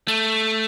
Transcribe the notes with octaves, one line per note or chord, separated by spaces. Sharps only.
A3